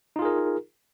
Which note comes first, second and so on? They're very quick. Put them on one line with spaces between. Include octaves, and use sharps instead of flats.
D#4 F4 G#4 A#4